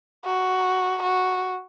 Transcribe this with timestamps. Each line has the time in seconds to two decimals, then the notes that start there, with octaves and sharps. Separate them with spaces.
0.25 F#4
1.03 F#4